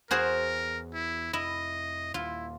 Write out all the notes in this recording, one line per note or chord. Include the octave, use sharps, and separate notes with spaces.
E2 F#4 G#4 A#4 C5
E4
F1 E4 D#5
D#1 D#2 A#2 E4 F4